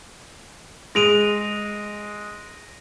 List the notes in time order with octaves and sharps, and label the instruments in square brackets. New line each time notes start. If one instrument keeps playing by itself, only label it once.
[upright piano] G#3 F7 [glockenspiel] A#6 D7 D#7